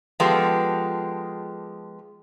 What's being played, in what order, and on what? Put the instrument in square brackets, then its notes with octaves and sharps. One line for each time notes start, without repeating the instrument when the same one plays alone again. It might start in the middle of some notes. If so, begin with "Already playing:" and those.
[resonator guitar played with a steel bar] F3 G#3 B3 G4 A4